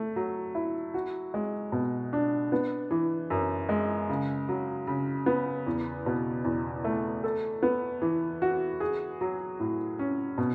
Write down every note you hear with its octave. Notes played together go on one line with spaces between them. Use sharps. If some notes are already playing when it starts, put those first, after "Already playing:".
Already playing: A3
F#3
E4
F#4
G#3
B2
D4
B3
E3
F#2
G#3
C#3
F#3
C#3
B3
E2
B2
E2
A3
A4
B3
E3
F#4
G#4
F#3
A2
C#4
B2